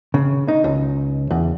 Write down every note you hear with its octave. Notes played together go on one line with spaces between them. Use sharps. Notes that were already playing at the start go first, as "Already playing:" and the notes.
C#3
D#4
C#2
E2